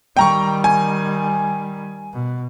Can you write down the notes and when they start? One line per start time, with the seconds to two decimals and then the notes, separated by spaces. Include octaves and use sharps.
0.17 D#3 G3 G5 A#5 C#6
0.64 G#5
2.13 B2